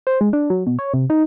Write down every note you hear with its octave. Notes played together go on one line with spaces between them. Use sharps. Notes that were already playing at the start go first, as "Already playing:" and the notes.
C5
G#3
D4
F#3
B2
C#5
C3
D#4